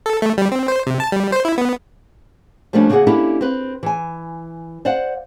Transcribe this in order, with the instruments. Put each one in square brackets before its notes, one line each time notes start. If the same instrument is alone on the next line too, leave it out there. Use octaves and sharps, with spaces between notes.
[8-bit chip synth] A4
A3
G3
C4
C5
C3
A5
G3
C5
E4
B3
[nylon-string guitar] F3 G3 A3 A#3 C#4 D4
C#3 A#3 F#4 G#4 F#5
A#3 C#4 D4 E4 G4 A4
C4 B4
E3 G#5
C5 D5 F5 F#5